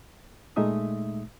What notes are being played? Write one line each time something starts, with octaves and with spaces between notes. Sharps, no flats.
A#2 G#3 A3 D#4 E5 D#6